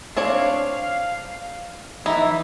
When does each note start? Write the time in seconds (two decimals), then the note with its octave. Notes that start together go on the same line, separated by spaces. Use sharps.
0.17 C4 D4 C#5 F5
2.06 E3 D#4 E4